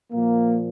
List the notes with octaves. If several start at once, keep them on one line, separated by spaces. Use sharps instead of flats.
A#2 F3 A#3